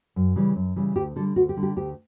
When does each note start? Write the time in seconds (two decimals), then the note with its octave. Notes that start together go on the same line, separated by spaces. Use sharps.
0.16 F#2
0.36 C#3 E3 G3
0.56 F#2
0.76 C#3 E3 G3
0.96 D2 G4
1.16 D3 A4
1.19 G3
1.36 D2 F#4
1.49 G4
1.56 D3 G3
1.63 G4
1.76 D2 G4